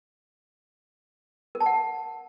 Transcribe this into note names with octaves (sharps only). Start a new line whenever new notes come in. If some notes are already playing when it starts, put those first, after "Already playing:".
A#4
A5
F#5